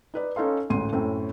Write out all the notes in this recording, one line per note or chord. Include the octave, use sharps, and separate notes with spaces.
D#4 B4 D5
C#4 D#4 A4 F5 C6
A1 D2 G#2 C6 D#7
F#2 A2 C4